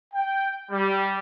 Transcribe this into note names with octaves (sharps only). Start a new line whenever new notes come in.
G5
G3